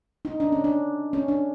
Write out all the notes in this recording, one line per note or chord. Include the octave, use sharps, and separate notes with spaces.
D#4
D4
C#4
D4
C#4
D4